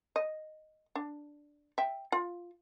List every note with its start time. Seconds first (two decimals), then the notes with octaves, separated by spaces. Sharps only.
0.16 D#5
0.95 D4
1.78 E5 G5
2.12 F4